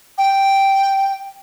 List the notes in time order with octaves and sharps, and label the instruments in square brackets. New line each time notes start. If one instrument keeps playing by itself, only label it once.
[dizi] G5